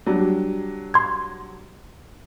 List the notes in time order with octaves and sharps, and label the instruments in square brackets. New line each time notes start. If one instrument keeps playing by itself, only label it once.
[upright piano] F#3 G3 D4
[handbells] C6 G#6